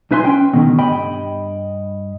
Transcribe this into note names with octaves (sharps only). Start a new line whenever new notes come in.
B1 D#4 B4 E5 G#5 C6
C#4 G5
B2 D3 D#3 A3
G2 D#5 G5 B5